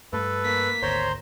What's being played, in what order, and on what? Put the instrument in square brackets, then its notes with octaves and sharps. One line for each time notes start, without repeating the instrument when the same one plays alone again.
[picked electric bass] G2 A3 [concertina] A4 [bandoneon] B4
[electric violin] A#3 B6
[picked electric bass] G#1 D2 [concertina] C5 A#5 C6 [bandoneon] C#5